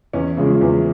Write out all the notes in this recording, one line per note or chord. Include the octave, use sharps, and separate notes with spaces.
E2 C#4
C#3 F3 G#3
E2